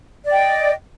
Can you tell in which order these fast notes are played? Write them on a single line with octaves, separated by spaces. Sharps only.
D5 G5 D#5